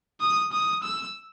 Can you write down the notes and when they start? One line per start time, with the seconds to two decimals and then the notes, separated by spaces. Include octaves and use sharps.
0.21 D#6
0.52 D#6
0.83 E6